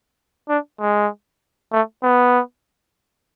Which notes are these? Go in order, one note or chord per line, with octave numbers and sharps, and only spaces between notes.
D4
G#3
A3
B3